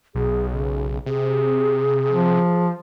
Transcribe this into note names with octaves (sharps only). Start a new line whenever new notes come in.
B1 G#4
C#3
C3 G#4
F3